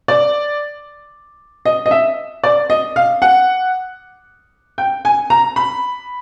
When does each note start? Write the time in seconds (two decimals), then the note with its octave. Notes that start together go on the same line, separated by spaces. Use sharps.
0.08 D5
1.65 D#5
1.86 D#5
1.91 E5
2.44 D5
2.70 D#5
2.96 F5
3.22 F#5
4.78 G5
5.05 G#5
5.30 A#5
5.56 B5